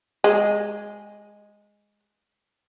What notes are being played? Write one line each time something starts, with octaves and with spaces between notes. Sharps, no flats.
G#3